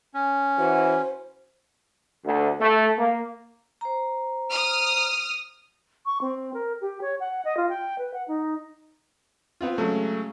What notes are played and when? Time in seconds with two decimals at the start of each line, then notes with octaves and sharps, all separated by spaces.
0.14 C#4
0.58 E3 F#4 C5
2.25 D2
2.61 A3
2.99 A#3
3.81 C5 A#5
4.51 D#6 F6
6.06 C#6
6.21 C4
6.54 A#4
6.81 G4
7.01 C#5
7.20 F#5
7.45 D#5
7.57 F4
7.69 G5
7.98 B4
8.14 F#5
8.28 D#4
9.61 B3 C4 F4
9.78 C#3 F#3 G#3 A3